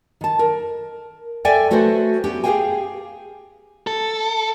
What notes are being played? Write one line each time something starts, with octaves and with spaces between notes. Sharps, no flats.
D#3 A5
A#4
A4 D5 E5 G5 G#5
A3 F#4 A4 B4 C5
B3 C#4 G4
G4 G#4 C5 F5 G5 G#5
A4